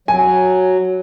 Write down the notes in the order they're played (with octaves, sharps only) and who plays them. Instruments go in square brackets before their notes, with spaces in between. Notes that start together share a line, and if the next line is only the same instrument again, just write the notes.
[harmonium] F#3 [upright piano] G#5